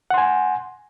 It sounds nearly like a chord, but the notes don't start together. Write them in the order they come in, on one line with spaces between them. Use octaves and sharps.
F#5 C6 G#5